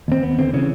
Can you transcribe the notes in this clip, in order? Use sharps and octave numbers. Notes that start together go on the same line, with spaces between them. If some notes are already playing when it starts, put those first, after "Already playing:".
D#2 C4
D#2 B3
D3 C4
C#3 E3 C#4